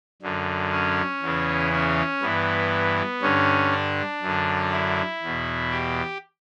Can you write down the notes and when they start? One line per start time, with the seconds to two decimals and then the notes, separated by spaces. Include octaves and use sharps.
0.22 F#2 D3
0.71 C#4
1.22 E2 C#3 E3
1.72 C#4
2.22 G2 E3 B3
3.21 G2 D3 C#4
3.71 D4
4.22 F#2 D3
4.72 E4
5.22 E2 B2
5.71 G4